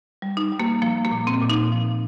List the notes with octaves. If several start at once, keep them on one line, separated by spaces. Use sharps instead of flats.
G3
D#4
G3
A#3
F3 A#3
A#3
A#2
C4
A#2
D#4
F3